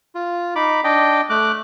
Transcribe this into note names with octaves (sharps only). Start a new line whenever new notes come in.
F4
D#4 B5 D6
D4 D#5 G5
A3 D6 F#6